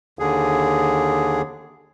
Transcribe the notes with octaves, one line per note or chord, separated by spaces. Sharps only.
D#2 D3 G#4